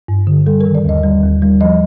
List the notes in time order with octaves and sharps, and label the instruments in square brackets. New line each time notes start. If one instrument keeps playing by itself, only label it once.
[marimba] G2
D3
G3 A4
A#4
D#3
D5
D#2 D#5
G3
D#2
G3
F3 D#5